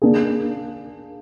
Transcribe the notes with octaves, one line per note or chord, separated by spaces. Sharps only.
A#3 D4 G#4